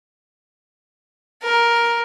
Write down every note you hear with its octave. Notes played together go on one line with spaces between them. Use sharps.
A#4